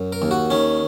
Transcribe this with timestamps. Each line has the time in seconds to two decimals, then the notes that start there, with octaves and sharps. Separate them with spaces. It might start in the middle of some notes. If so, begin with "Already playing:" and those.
Already playing: F#2
0.12 A#4
0.22 D#2
0.31 F#4
0.50 D#3 C#4